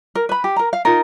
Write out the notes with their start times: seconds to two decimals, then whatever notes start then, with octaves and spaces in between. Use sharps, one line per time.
0.15 A#4
0.29 B4 B5
0.44 G4
0.56 A#4 A#5
0.73 F5
0.85 D#4 F4 A#4